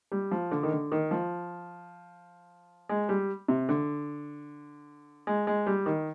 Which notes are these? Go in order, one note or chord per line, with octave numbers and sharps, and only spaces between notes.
G3
F3
D3
D#3
D3
D#3
F3
G#3
G3
C3
D3
G#3
G#3
G3
D#3